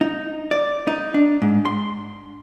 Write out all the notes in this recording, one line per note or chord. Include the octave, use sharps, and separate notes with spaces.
D#4
D5
D#4
D4
G#2
C6